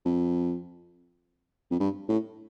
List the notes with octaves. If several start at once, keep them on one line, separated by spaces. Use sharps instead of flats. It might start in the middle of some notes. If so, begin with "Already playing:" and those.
F2
F2
G2
A2